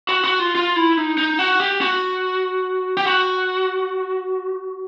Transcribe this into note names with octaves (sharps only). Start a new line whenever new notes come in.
F#4
F#4
F4
F4
E4
D#4
D#4
F#4
G4
F#4
G4
F#4